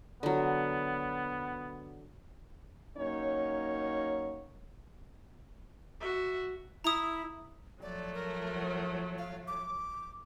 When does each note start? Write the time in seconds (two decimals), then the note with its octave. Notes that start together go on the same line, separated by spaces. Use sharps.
0.23 D3 F#3 B3
2.96 F#3 A#3 C#4 D#4 C#5
6.01 F#4 E5
6.84 E4 A#5 D#6
7.82 F3 F#3 A3 D5
8.14 A#4
9.18 F5
9.48 D6